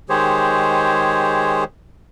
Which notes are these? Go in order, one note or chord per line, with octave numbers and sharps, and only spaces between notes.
D#3 G#3 G4 G#4 C5 C#5